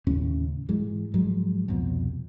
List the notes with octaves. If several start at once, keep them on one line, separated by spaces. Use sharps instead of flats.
D#2 A2 C#3 C#4
G#2 E3 G#3
G#2 F3 F#3 G#3
C2 F2 B2 F3